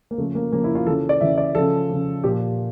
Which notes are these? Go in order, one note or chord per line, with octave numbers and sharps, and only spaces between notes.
A#3
C#3 F3 A3
A#3
C#3 F3 A#3
E4
F4
C#3 E3 A4
D5
C#3 E3 E5
D5
C#3 F3 A4
C#3 F3
A#2 F3 G4